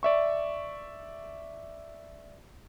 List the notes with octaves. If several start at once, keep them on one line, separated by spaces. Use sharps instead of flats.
D5 E5 C#6